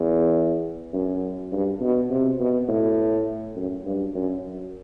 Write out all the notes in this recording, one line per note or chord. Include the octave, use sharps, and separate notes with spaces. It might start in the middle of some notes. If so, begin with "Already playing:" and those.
Already playing: E2
F#2
G2
B2
C3
B2
A2
F#2
G2
F#2